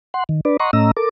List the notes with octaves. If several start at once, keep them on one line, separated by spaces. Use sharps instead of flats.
F#5 C6
D#3
D4 B4 D5
D#5 F#5 A#5 C6 C#6
A2 A3 C#4 D#5 A#5 E6
A4 A#4 D6